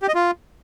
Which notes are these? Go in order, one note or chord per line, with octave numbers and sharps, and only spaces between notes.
G4
D#5
F4